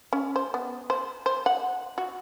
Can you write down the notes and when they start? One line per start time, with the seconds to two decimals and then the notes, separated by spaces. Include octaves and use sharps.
0.13 C#4
0.36 C5
0.54 B3
0.90 C5
1.26 C5
1.46 F#5
1.98 F#4